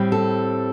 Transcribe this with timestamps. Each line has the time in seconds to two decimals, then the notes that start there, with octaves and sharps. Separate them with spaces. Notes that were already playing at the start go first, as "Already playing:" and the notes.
Already playing: A2 G3 C4
0.12 A4